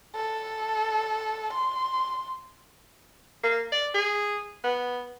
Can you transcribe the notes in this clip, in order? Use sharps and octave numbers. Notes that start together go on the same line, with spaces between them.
A4
C6
A#3
D5
G#4
B3